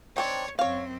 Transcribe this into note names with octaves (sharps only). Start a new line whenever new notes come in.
D#3 C4 D4 C#5
F#2 C4 C#5 F5